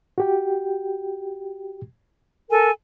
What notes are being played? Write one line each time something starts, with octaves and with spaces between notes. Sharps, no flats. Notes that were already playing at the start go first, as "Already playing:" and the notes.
F#4 G4 G5
A4 A#4 G#5